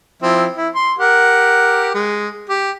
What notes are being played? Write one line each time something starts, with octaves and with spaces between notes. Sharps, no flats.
F3 C4 E4
E4
C6
G4 A#4 F#5
G#3
G4